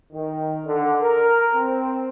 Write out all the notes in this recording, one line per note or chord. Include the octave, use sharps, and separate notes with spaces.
D#3
D3
A#4
C4